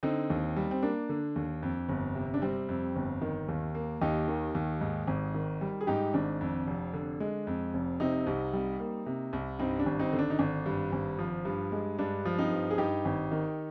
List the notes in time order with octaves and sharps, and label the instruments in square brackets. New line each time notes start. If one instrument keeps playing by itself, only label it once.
[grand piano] D3 C4 D#4
D#2
G3
C4
A#3 D4
D3
D#2
F2
G1
C3
D4
G3 C4
F2
G1
D#3
D#2
A#3
D#2 D#4 G4
D#3
D#2
G#2
G#1
D#3
G3
G#4
G#2 D#4 G4
G#1 D4
F2
F1
D3
G#3
F2
F1
C3 C4 D#4
C2
G3
A#3
C3
C2
G2 C4 D#4
D4
G#1
C4 D#4
D3
D4
D#4
G#1 D4
G2
G#1
F3
G2
G#3
G2 D4
F3
C4 D#4
G2
G#4
G2 D#4 G4
G#1
D#3